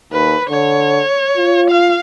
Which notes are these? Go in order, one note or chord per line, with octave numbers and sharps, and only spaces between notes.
D#2 B4
D3 C#5
F4
F5